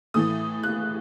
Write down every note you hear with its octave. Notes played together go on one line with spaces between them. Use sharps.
A2 E3 A3 D#6
F#6